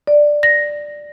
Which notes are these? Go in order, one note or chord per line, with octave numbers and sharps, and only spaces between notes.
D5
A#6